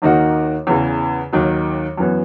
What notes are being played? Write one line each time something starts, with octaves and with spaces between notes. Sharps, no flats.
D#2 D#3 A#3 D#4 F#4
E2 C#3 E3
D#2 D#3 F#3
F#2 E3 B3